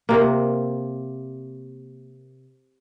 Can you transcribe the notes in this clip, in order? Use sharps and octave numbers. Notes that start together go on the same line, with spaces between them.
C3 A#3